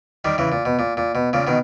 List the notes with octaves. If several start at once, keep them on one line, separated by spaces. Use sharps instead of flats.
D#3 G3
C#3 E3
A#2
B2
A#2
A#2
B2
A#2 C#3
B2 D#3